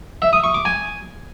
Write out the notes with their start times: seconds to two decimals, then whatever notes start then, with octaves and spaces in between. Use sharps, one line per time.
0.22 E5
0.33 D#6
0.44 C#6
0.54 D6
0.65 G#5